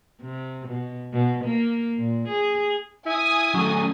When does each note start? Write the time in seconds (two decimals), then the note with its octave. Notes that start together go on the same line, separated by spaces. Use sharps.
0.21 C3
0.68 B2
1.13 B2
1.45 A#3
1.97 A#2
2.28 G#4
3.06 E4 G#5 D#6
3.55 F#3 A3 C#4